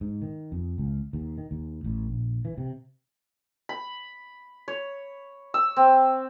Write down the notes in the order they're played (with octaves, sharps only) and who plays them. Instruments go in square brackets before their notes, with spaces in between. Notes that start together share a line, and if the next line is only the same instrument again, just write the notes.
[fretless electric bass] G#2
D#3
F2
C#2
D#2
D#3
D#2
A1
A#1
E3
C3
[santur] B5
C#5
E6
C4